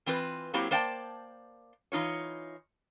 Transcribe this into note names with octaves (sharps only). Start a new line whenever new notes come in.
E3 C4 F4 B4
F#3 A#3 C4 E4 G4
A#3 C5 D5 G5 A5
E3 D#4 F4 C#5